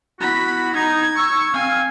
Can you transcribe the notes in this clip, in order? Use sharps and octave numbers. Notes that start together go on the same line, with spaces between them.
B3 E4 F#4 B5 B6
D#4 G#6
C#6 E6
C4 F5 G#5